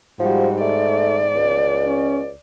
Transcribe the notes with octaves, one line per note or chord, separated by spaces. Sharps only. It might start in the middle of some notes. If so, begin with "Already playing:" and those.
G#2 F3 G3 F#4
A3 D5
C#2
C#4